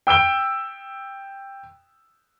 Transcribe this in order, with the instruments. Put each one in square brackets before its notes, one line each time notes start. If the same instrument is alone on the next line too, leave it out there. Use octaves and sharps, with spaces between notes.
[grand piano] G5 E6 D7 G7